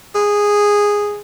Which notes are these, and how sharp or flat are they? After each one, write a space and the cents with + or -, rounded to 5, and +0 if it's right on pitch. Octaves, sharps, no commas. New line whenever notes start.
G#4 -10